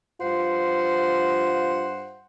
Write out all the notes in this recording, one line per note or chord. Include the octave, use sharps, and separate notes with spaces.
G2 F4 C5 F#5